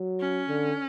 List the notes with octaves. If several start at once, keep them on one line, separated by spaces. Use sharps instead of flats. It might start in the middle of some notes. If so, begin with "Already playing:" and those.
Already playing: F#3
C#4
D3